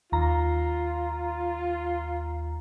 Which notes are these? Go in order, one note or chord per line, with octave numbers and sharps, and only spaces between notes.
D#2 F4 A#5